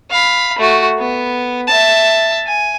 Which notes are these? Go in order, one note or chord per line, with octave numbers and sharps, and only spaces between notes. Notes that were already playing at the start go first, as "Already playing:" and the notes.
F5 B5
A3 F#4
B3
E5 A5
G#5